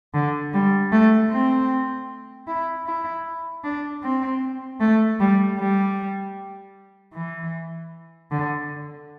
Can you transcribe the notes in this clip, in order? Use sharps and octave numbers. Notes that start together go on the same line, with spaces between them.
D3
G3
A3
C4
E4
E4
D4
C4
A3
G3
G3
E3
D3